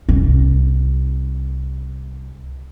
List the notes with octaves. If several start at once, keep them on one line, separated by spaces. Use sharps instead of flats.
C2 C#4